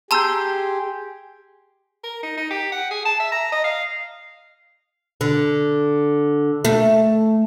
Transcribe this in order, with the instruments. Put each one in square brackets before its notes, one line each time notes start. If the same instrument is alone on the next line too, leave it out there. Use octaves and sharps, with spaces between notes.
[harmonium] G4 G#4 [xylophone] A5 A#5 E6 [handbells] C6 G6
[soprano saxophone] A#4
D#4
D#4
G4
F#5
G#4
A5
E5
A#5
D#5
F5
[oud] D3
A3